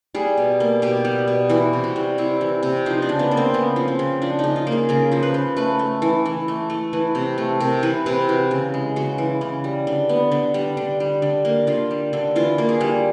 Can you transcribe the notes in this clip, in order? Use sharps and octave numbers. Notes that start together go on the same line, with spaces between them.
G3 G#4
B2
A#3
B2 G4
G3
B2
E3 F#4
C3
F#4
G3
C3 E4
E3
C3
F3 D#4
D4
C#3
B3
A#3
C4
C#3 B3
F3
C4
C#3
F3 D4
C#3 D#4
F4
A#3
G#4
C#3 A#4
F3 C5
B4
C#3
A3 B4
A3
E3
E3
A3
A3
E3 B4
C3
A3
C3 A#4
E3 B4
C3 B4
E3 F#4
C#3
G#3
C#3 F#4
E3
C#3
G3
D3
B3
D3
G3
D3
G3
D3
A#3
D3 F4
G3
D3
E3 F4
A#3
G#4
G3